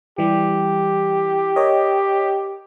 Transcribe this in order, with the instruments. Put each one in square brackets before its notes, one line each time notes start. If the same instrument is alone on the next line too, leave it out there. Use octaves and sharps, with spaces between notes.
[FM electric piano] E3 G3 [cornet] G4
[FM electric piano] A#4 C#5 D#5